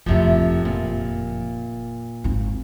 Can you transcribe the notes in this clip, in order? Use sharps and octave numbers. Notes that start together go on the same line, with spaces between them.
F#1 F2 A2 C3 F3
A#2
G#1 D#4